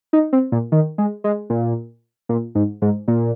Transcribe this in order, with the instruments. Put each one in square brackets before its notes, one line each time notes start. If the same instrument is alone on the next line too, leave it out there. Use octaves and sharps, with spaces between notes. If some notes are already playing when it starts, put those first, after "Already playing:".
[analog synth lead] D#4
C4
A#2
D#3
G#3
G#3
A#2
A#2
G#2
G#2
A#2